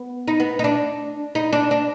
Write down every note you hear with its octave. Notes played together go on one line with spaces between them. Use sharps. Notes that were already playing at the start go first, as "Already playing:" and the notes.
Already playing: B3
D#4
B3
D#4
D4
D#4
D4
D4